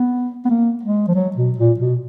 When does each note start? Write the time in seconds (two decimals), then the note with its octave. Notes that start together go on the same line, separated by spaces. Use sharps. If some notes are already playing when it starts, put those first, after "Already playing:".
Already playing: B3
0.45 B3
0.49 A#3
0.83 G#3
1.07 F3
1.14 F#3
1.36 B2
1.58 A#2
1.79 B2